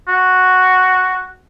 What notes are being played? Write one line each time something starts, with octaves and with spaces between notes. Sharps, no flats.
F#4